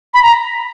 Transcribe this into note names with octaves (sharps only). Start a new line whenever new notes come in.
B5
A#5